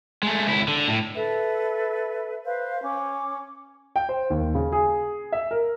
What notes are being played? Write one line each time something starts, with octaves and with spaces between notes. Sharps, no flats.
G#3 A3
C#2 E4
D3
A2
A4 B4 E5
B4 C5 F5
C#4 D6
G5
C5
D#2
C#3
G#4
E5
A#4